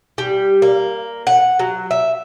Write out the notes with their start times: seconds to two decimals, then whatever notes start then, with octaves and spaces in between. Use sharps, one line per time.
0.18 G3
0.62 A#3
1.27 F#5
1.59 F#3
1.91 E5